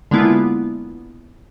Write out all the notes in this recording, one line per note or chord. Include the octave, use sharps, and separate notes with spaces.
D3 G#3 A#3 B3 E4 F4